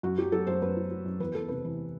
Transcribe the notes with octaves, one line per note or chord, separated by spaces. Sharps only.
F#2 F#4
F#3 G4
F#3 A4
F#2 C5
F#2 B4
F#3
F#3
F#2
E2 B4
E2 A4
C3 B4
E3